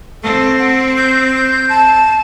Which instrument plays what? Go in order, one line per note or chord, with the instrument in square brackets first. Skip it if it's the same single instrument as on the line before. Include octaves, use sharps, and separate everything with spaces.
[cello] C4 [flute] A4
[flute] F#5
G6
A5